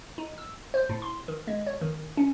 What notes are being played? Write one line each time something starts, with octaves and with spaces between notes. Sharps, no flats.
D#4
E6
C5
A2
C6
D#3
G#3
C#5
D#3
C#4